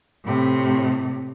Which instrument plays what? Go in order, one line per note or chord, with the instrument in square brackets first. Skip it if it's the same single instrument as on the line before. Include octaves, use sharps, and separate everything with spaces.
[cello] A2 C3